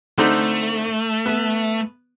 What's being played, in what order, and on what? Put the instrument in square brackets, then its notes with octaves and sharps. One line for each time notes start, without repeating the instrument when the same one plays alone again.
[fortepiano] D3 C4 D#4 [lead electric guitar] A3
[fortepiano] B3